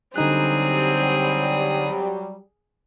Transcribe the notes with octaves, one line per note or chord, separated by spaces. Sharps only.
D3 F#3 G3 C4 D#4 G#4 F#6